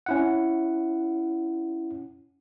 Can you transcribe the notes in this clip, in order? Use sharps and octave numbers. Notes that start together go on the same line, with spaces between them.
C#4 E4 F#5